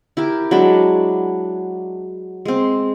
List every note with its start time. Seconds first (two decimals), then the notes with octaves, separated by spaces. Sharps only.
0.17 E4 G4 A#4
0.51 F#3 G#3 D4 B5
2.45 G#3 C4